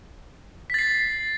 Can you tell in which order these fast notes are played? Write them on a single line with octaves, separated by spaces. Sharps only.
B6 A6 C7